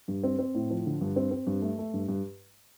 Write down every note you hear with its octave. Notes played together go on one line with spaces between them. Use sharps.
G2
C4
C4
A2
F3
D3
G2
C4
C4
G2
A3
A3
G2
G2